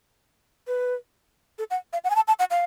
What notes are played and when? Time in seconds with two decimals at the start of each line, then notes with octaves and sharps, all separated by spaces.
0.67 B4
1.58 A4
1.70 F#5
1.93 F5
2.04 F#5
2.10 G#5
2.15 A5
2.28 A5
2.39 F#5
2.50 F5